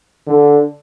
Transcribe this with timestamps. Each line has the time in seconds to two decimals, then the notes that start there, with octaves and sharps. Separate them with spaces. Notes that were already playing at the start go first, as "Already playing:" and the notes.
0.27 D3